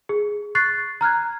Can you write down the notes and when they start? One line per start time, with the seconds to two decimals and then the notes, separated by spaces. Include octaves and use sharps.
0.09 G#4
0.55 C#6 F#6 A6 C7
1.01 A#5 F6 F#6 G#6